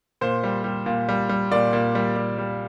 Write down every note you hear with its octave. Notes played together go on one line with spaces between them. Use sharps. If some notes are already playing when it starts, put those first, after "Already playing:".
A#2 C5
G3
G3
A#2
G3
G3
A#2 D5
A#2
G3
G3
G3